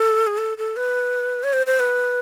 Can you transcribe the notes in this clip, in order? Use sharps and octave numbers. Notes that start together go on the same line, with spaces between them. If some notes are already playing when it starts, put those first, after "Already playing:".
Already playing: A4
G#4
A4
A4
B4
C#5
C5
C5
B4